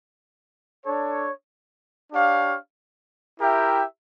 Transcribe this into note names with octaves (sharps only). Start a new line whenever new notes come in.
D4 A4 C#5
D4 G4 C#5 F5
E4 G4 A#4 E5 G5